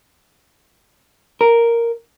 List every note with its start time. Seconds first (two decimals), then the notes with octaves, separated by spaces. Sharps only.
1.41 A#4